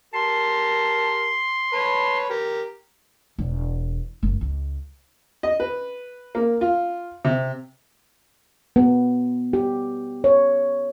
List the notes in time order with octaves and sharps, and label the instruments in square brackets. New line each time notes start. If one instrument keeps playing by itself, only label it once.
[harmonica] G4 A#4 A5 [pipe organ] C6
[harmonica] B4 C#5 A5
G4 A#4
[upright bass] E1
F#1
C#2
[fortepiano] D#5
B4
A#3
F4
C3
[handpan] B3
G4
C#5